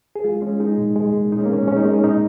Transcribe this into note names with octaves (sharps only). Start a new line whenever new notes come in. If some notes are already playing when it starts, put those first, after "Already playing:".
G#4
G#3 F4
G#3 C#4
G#3 D#4
A#2
G#3
A#2
G#3 D#4
C#4
A#3
A#2 C#4
G#3 C#4
D#4
G#3 A#3
C#4
A#2 D#4